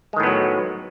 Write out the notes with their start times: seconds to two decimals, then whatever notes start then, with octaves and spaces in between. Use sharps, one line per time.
0.13 G#3
0.16 D#3
0.20 A2
0.23 B3
0.27 F#3